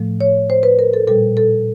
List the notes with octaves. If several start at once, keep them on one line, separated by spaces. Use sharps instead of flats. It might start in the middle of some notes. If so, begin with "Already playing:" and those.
Already playing: A2 F3 A3
C#5
C5
B4
A#4
A4
A#2 G3 A4
A4